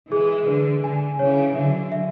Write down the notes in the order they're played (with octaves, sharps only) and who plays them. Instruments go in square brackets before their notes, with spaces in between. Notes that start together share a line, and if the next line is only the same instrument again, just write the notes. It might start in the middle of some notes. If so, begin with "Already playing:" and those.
[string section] E3 G#3 [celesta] G#4
[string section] D3 [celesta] B4
[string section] D3 [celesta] G#5
[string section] C#3 E3 [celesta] C#5
[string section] D3 F#3 [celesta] E5
[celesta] E5